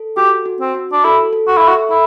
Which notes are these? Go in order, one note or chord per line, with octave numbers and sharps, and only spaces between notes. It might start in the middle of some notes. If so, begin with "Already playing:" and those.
Already playing: A4
F#4 G4
F#4
C4
F#4
D4
E4 A4
A4
F#4
E4 E5
F#4
E4 A4